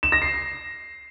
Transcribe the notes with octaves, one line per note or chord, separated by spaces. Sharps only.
E7
A#6
C7